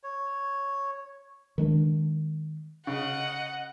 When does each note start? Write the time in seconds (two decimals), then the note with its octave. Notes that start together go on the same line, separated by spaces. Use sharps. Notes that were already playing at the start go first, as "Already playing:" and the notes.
0.03 C#5
1.58 D#3 G#3 D4
2.87 C#3 D#5 F#5